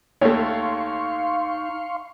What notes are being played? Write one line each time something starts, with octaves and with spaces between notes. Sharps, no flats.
D#2 A3 D#4 C#5 F5 C6 C#6